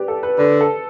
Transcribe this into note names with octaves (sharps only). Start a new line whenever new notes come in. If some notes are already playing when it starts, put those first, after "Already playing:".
Already playing: G4 B4 D5
A4
B4
D3 B4
A4